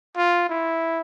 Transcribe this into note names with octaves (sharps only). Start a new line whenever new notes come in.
F4
E4